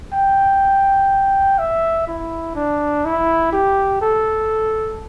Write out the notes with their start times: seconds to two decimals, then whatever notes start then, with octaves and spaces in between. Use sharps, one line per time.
0.13 G5
1.58 E5
2.07 E4
2.55 D4
3.05 E4
3.53 G4
4.02 A4